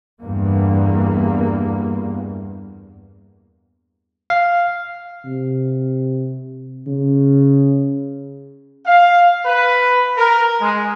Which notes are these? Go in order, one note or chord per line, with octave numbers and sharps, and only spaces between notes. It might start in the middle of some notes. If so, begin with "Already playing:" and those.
E2 G2 A#3
F5
C3
C#3
F5
B4
A#4
G#3